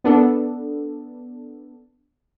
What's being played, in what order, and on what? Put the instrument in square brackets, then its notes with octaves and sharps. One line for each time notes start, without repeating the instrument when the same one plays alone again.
[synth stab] B3 D4 A4